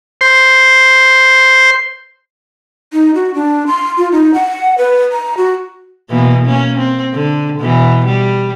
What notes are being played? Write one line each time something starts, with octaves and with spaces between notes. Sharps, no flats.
C5 C6
D#4
F#4
D4
C6
F4
D#4
F#5
B4
A#5
F#4
B2 E3 A#3
A#3 C#4
C4
D3
B2 E3
G3